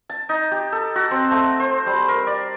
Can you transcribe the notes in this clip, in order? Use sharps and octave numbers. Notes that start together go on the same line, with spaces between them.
A5
D#4
G4
A4
F#4
C4
A3
C5
G3
A#4
D5